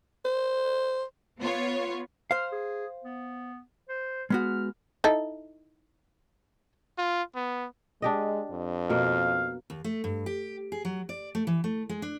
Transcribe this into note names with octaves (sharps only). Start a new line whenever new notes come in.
C5
B3 F4 C#5
C5 F5 F6
G#4
B3
C5
G#3 B3 F#4 F6
D#4 E4 A4
F4
B3
G#3 D4 G4 D#5
F2
B2 A#3 F5
D#2
A3
G2
G4
G#4
F#3
D5
A3
E3
A3
G#3
D4